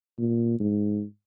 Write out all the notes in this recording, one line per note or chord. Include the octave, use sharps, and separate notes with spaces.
A#2
G#2